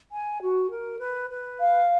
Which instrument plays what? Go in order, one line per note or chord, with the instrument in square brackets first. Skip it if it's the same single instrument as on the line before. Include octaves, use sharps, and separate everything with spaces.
[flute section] G#5
F#4
A#4
B4
B4
F5